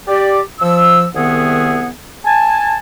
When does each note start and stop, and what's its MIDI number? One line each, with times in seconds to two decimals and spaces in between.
0.08 0.40 67
0.08 0.40 74
0.60 1.05 53
0.60 1.05 88
1.15 1.88 36
1.15 1.88 51
1.15 1.88 59
1.15 1.88 68
1.15 1.88 76
1.15 1.88 78
2.25 2.79 80
2.25 2.79 81